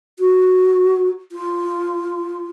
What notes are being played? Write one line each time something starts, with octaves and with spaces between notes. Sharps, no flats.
F#4
F4